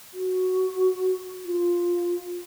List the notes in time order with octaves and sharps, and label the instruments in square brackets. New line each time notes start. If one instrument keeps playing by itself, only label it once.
[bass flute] F#4
F4